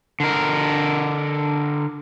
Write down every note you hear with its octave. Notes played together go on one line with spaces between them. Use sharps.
D3 A#4